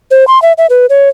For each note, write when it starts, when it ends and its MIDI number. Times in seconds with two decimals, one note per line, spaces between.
0.11 0.27 72
0.28 0.41 84
0.42 0.53 76
0.58 0.66 76
0.70 0.86 71
0.89 1.09 73